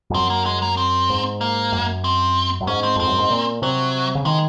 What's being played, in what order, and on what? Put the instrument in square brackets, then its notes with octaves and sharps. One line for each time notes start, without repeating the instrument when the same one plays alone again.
[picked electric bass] F2
[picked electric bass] F#2 [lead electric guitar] C4
[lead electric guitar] A#3
G#3
A#3
C4
[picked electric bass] G#2
[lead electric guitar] A#3
[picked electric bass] F#2
[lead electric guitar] C4
[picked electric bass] F#2
[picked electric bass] G#2 [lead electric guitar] C#4
[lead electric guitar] C4
[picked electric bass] F2 [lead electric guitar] C4
[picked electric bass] F#2
G#2
A#2
[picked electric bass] C3 [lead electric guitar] F#3
[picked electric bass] C#3
[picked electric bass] D#3 [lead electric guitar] G#3